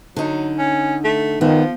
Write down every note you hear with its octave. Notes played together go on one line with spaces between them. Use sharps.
D3 F#3 D#4
C#4
A3
D#3 F3 B3